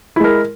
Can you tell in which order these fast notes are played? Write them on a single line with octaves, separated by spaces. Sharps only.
E4 G#3 A#4